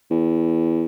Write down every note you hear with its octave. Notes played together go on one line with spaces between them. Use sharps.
E2